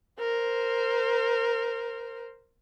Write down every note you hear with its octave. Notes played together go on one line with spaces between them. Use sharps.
A#4 C5